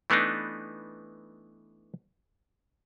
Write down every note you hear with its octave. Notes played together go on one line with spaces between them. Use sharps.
E3 A3 B3 D4 D#4